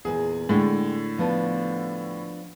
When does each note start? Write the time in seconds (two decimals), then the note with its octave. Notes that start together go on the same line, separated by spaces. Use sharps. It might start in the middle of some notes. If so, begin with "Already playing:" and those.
0.05 E2 A#2 G#4
0.49 A2 D3 G#3 G5
1.19 F3 B3 D4